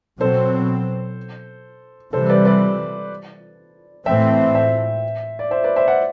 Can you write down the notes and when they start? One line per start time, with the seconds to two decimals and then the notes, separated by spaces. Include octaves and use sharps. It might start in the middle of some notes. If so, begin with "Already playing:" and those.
0.20 B2 F#3 C4 A4 C5
2.13 C3 E3 G3 A4 C5
2.29 B4 D5
2.45 B4 D5
4.06 A2 E3 A3 C4 E5 G5
4.54 C5 E5
5.39 D5
5.51 C5 E5
5.64 B4 D5
5.76 C5 E5
5.87 D5 F#5